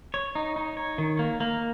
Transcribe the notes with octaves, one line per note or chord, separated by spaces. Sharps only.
C#5
D#4
D#4
C#5
D#3
A#3
A#3